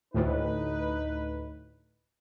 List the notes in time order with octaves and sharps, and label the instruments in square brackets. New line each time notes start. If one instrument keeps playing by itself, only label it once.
[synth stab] D2 A2 [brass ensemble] D#4 B4